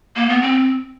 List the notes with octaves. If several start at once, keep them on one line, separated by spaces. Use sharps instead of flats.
A#3
B3
C4